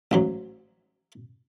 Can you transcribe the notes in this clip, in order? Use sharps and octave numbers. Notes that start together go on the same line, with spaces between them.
A1 G#2 F#3